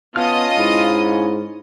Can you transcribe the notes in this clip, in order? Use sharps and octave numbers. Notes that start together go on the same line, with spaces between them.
B3 C#4 F4 D#5 F5 A5 D#6 F6
G#2 E4